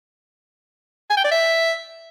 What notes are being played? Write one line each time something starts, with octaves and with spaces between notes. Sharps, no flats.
G#5
G5
D5
E5